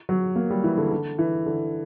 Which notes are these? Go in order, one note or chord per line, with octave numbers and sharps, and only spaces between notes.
F#3
A#3
G3
E3
D3
D3
E3
D3